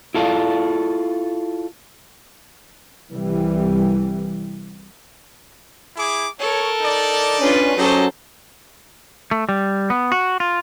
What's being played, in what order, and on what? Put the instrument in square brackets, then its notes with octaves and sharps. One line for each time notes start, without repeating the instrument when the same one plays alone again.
[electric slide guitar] E4 F4 A4 D5 F5
[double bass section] C2 E3 G3
[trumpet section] E4 G#4 D6
[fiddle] A4 A#4 [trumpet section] C#5
[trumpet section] D#4 D5
[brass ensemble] C#4 D4 [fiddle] F4 B4
[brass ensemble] F#2 F#3 C#4 [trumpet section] D#4 G4 D#5 [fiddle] A4 C5
[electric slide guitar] A3
G3
B3
F#4
F4